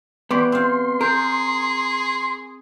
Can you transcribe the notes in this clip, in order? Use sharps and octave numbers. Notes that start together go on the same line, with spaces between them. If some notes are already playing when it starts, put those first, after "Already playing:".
E3 G3 B3 C#5 C6 D6
C4 F4 C6
G#4 A#4 C5